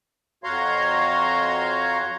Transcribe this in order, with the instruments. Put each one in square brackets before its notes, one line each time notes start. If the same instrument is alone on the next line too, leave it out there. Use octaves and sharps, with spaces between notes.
[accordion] F2 F#4 C#5 F5 A#5 C6